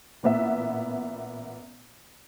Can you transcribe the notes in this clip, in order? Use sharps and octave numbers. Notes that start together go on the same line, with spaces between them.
A1 A#2 B3 E5